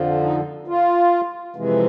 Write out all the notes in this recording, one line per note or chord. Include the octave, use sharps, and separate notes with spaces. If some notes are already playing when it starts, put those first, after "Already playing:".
Already playing: F2 D3 F3
D#4
F4
F2 C3 E3 G#3